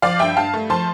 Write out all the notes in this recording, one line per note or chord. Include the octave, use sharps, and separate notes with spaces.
F3 D5 F5
G2 E5 G5
G2 F5 A5
A3
F3 A5 C6